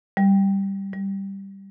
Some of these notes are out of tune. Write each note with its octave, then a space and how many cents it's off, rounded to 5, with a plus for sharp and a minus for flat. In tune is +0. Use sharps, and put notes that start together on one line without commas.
G3 +0
G3 +0